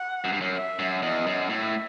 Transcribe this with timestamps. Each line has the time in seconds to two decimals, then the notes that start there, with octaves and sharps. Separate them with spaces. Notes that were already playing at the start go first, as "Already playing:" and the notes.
Already playing: F#5
0.25 F#2
0.32 G2
0.41 F#2
0.56 E5
0.79 F#2
1.02 E2 D#5
1.27 F#2
1.50 A2 E5